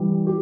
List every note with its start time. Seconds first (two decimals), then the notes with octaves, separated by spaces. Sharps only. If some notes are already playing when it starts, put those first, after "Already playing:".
Already playing: E3 G3
0.27 G4